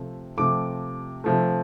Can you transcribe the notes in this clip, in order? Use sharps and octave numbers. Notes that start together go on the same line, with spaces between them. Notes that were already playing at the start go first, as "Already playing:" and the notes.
Already playing: C3 F3 A3
C3 F3 A3 D6
C3 F3 A3